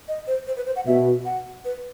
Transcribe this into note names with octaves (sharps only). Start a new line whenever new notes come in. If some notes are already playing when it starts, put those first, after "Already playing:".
D#5
C5
C5
B4
C5
F#5
B2 E5
F#5
B4